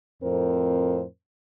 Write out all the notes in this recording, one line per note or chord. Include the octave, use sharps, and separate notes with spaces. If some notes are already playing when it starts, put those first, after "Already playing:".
F2 A2 C4 A#4 C5